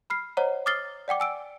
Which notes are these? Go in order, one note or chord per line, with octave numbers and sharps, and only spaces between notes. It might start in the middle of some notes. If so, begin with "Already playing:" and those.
B5 F6 C7
C5 C#5 D#5 F#5 A#5
D6 D#6 F6 A6 C7 G7
D5 F#5 G5 D6
G#5 E6 D7